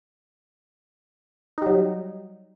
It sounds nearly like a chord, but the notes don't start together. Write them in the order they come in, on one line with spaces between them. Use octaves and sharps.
D#4 G3 F#3